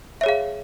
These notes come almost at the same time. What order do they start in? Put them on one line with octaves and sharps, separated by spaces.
E5 C#5 G#4 F5